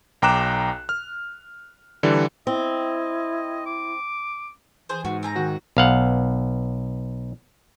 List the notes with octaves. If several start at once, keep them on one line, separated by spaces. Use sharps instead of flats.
B1 G5 A#5 D6 F#6 E7
F6
D3 E3 G3
C4 E4 D#5
D6
E3 G#4 C5
G#2 F#4
C4 G#5 A#5
D#3 F#4
B1 F5 F#5